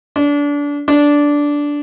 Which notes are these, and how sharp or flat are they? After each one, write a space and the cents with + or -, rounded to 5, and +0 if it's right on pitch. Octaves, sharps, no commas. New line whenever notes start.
D4 -25
D4 -10